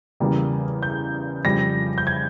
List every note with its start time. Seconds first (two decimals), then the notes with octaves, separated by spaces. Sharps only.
0.20 E2 C#3 G3 A#3
0.83 G6
1.44 F2 C#3 G3 A#6
1.98 G6
2.07 G#6